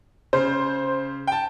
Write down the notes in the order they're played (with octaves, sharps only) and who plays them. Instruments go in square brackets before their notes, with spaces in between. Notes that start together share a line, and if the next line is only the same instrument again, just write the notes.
[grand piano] C#3 [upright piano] C5
[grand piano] G5 A5